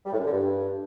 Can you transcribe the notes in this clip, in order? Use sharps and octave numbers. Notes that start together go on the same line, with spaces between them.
G3
A2
F#2
D3
G2